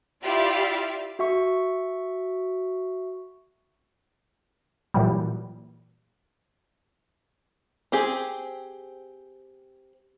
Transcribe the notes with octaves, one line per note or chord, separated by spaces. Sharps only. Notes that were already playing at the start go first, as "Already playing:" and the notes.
E4 F4 G4 D5 E5 F5
F#4 E5 C#6
A#2 E3 F#3 G3
C4 G4 G#4